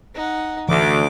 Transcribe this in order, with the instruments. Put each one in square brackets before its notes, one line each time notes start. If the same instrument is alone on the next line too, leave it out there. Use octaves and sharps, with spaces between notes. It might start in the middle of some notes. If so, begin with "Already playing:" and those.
[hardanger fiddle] D#4 F#5
[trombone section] D2 [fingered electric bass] E3 A3 [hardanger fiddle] D6